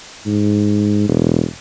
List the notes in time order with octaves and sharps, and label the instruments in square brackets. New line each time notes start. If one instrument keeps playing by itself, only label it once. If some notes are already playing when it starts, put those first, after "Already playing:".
[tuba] G#2
E1